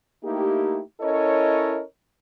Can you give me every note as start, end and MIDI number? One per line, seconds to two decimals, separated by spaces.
0.25 0.79 57
0.25 0.79 58
0.25 0.79 63
0.25 0.79 64
0.25 0.79 67
1.01 1.81 61
1.01 1.81 64
1.01 1.81 69
1.01 1.81 70
1.01 1.81 73
1.01 1.81 75